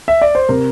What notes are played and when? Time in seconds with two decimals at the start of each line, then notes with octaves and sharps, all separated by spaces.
0.08 E5
0.21 D5
0.35 C5
0.49 C3 A#4